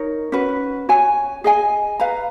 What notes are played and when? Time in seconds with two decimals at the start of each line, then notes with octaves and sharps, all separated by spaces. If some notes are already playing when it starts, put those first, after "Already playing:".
Already playing: D#4 A#4 C#5
0.32 C#4 F#4 B4
0.89 F#4 C#5 G#5
1.44 G#4 D#5 G#5
2.00 B4 F5 A#5